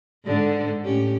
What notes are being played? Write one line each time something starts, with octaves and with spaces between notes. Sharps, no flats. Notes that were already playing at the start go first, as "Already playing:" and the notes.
G#2 D3
A2 C#4 G4